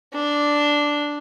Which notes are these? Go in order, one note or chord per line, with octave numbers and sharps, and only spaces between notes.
D4